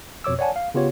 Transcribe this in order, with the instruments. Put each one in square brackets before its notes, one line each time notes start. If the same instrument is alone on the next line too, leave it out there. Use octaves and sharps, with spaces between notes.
[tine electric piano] F2 B2 C#5 D6 E6
C#5 D5 F#5 G#5 A5
F5
C#3 B3 F4 G4 C#5